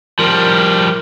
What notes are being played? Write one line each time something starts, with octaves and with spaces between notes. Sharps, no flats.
F3 G3 A#4